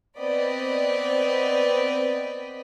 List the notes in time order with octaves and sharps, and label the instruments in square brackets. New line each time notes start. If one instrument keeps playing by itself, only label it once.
[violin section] B3 C4 D5 D#5 B6